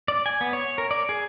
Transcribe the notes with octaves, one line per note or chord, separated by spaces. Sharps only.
D5
G#5
B3
C#5
A#4
D5
G#4